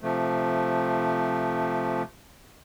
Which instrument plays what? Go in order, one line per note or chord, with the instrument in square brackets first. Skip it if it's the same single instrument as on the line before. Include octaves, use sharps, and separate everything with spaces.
[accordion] C3 F3 A3